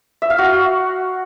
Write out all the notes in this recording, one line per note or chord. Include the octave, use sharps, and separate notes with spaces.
E5
F5
F#4